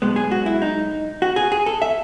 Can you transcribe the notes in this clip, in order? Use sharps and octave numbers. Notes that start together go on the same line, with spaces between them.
B1 B2 G#3 B3
G#4
F#4
E4
D#4
F#4
G#4
G#4
A4
E5